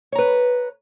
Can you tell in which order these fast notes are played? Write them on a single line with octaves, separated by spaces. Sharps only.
C#5 A#5 B4